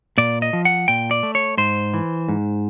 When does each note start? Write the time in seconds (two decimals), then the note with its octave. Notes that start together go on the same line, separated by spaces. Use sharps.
0.18 A#2 D5
0.42 D#5
0.53 F3
0.65 F#5
0.88 A#2 G5
1.11 D5
1.23 A3
1.35 C#5
1.58 G#2 C5
1.94 E3
2.29 G#2